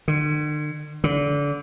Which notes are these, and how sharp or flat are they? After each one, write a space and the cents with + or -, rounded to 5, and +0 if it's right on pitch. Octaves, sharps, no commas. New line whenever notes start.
D3 +45
D3 -30